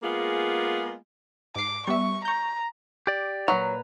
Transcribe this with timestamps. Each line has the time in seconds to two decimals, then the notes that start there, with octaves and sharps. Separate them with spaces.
0.03 G#3 A#3 B3 F4 G#4
1.56 G#2 D6 C7
1.87 G3 B3 E5 C#6
2.25 A#5 C#6 G6
3.07 G4 D5
3.48 A#2 F#3 B4 A#5